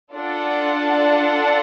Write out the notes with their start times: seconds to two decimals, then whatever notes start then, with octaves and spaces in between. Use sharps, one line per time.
0.13 D4 F4 A4 D5 F#5